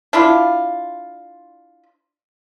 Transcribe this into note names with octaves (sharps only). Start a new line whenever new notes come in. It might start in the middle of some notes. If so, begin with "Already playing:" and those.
D4 E4 F4